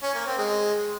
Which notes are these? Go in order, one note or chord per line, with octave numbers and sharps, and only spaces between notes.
C#4
A#3
C4
G#3